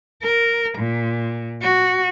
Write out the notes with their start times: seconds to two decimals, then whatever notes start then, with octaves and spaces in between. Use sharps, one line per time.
0.23 A#4
0.78 A#2
1.62 F#4